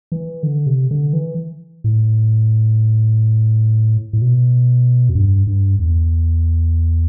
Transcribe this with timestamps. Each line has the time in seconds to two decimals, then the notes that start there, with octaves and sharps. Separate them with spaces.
0.12 E3
0.43 D3
0.66 C3
0.91 D3
1.13 E3
1.84 A2
4.13 A2
4.22 B2
5.09 F2
5.15 G2
5.47 G2
5.79 E2